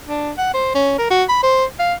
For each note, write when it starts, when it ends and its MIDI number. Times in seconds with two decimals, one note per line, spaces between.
0.07 0.31 62
0.38 0.51 78
0.54 0.72 72
0.75 0.94 61
0.98 1.07 70
1.10 1.24 66
1.29 1.41 83
1.43 1.65 72
1.79 1.94 77